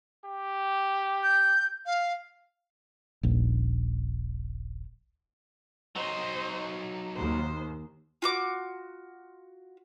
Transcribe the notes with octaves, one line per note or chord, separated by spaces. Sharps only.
G4
G6
F5
D#1 A#1
F#3 D#4 C5 D#5
D#2 C5
F4 F#4 D6